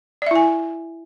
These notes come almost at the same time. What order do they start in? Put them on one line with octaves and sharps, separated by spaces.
D5 E5 E4 G#5